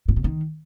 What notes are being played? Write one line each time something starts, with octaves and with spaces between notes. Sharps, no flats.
A2
B2
D#3